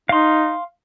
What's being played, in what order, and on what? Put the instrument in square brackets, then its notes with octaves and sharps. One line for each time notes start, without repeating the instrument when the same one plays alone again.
[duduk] D#4 [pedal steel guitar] F5 C6